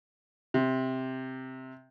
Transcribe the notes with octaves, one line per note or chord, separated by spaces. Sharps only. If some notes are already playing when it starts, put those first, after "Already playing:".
C3